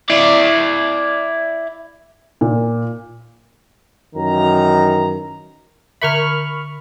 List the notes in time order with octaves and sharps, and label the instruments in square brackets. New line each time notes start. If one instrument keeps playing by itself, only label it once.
[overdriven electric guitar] E4 D5
[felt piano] A#2
[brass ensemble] F#2 D#3 E3 A#5
[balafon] D3 A#4 E5 [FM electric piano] B5 C#6 F6